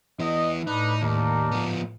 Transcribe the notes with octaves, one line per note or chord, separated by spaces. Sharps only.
E3 B3 D#5
A2 D4 D#4 B4
D#2 D4 D#4 A#4
F3 B3